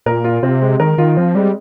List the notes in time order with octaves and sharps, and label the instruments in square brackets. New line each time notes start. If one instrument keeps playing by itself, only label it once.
[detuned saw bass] A#2 [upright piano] A#4
[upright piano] F4
[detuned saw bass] C3 [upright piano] C4
[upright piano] G#3
[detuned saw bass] D#3 [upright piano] A#4
[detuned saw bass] D#3 [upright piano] F4
[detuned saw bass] F3 [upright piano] C4
[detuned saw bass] G3 [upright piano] G#3